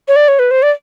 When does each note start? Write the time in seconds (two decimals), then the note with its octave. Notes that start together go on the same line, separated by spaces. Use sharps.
0.08 C#5
0.16 D5
0.28 C#5
0.39 B4
0.51 C5
0.63 D5